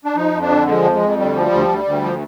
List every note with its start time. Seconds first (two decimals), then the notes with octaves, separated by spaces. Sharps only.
0.05 D4
0.16 F3 D#4
0.34 F2
0.41 D4
0.50 D3
0.67 F3 G#3
0.84 F2
0.92 G#3
1.01 F2
1.18 D2 G3
1.35 F3
1.51 D2
1.68 D2
1.85 D2
2.03 F3